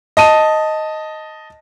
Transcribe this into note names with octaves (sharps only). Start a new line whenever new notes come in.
D#5 A5 D#7